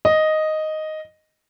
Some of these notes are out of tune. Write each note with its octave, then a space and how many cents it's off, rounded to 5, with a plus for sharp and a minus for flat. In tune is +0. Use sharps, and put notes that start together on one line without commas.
D#5 +0